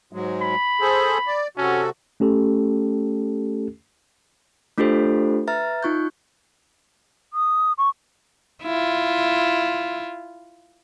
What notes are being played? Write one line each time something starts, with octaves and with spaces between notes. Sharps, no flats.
G#2 F#3 G#3
B5
G#4 A4 C5
D5
C3 C#4 F#4 A4
A3 C#4 G4 A4
A3 D4 F4 G4 A4 C5
B4 E5 A#5 F6 A6
D#4 F4 C#6 F#6 G6
D#6
C#6
E4 F4